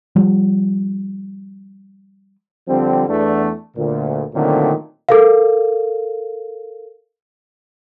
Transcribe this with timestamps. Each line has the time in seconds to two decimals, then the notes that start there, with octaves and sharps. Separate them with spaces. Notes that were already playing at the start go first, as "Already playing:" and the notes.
0.16 F3 G3
2.68 D3 F3 G3 C4
3.08 E2 A3 D4
3.77 D2 A#2
4.34 A#2 D3 D#3 F#3 A3 C4
5.09 A4 A#4 F5